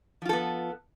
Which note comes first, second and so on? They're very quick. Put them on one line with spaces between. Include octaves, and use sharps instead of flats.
F3 F4 A4 B3